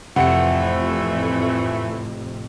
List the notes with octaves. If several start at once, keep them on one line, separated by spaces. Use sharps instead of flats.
F2 A2 C3 E3 A3 C4 F#5 C#7